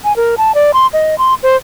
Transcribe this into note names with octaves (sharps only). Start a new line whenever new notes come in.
G#5
A#4
A5
D5
C6
D#5
C6
C5